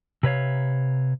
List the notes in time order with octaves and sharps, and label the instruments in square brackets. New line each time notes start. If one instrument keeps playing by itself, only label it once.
[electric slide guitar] C3 B4 C#5 F5